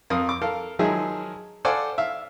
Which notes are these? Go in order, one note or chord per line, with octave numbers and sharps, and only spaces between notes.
F2 A#4 F5 D#6
D6
A4 A#4 F5
D#3 F3 F#3 G#3 G#4 E5
A4 C5 D5 F5 F#5 G#5
E5 F5